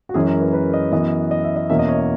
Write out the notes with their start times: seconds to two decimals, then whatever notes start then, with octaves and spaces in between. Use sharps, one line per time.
0.09 F#4
0.14 F#2 E3 G#3 C#4 G#4
0.28 A#4
0.41 B4
0.53 B4
0.73 D#5
0.92 F#2 E3 B3 D#5
1.31 D#5
1.44 E5
1.56 D#5
1.69 E2 B2 A#3 C#4 E5
1.79 D#5
1.88 C#5
1.99 D#5